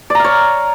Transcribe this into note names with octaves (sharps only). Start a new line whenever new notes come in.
C#5 D5 F5 A#5